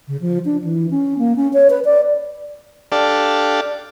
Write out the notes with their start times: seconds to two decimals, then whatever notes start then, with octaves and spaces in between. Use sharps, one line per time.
0.08 C#3
0.21 F3
0.45 D4
0.64 E3
0.91 C#4
1.19 A#3
1.36 C#4
1.53 C#5
1.70 B4
1.85 D5
2.92 D4 G4 A4 D5 F5